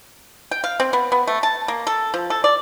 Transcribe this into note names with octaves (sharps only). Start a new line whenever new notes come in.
G5
F5
C4
B3
B3
A3
A5
A#3
A4
F3
A4
D5